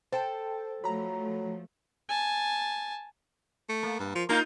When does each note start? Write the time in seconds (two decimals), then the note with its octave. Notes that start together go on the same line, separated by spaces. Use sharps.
0.12 A4 C5 G5 A5
0.84 F3 F#3 A3 A#5 B5
2.09 G#5 A5
3.69 A3
3.83 A#3
3.99 G2
4.15 F3
4.29 A#3 D#4 F4